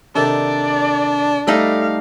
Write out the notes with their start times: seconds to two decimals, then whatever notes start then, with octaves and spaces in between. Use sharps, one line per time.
0.16 C3 D#3 D4 A4 D5
1.47 G3 A3 D#4 A4 F5